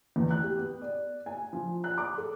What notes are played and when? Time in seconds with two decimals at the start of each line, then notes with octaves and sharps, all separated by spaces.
0.16 E2
0.31 F#6
0.43 G4
0.57 B3
0.82 D5
1.26 G#5
1.53 F3
1.84 F#6
1.98 D6
2.18 A4